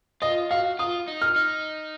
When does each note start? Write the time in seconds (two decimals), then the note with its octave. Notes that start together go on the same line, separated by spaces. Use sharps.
0.22 F4 D#5
0.51 F#4 F5
0.79 F4 D#6
1.08 D#4
1.22 F6
1.36 D#4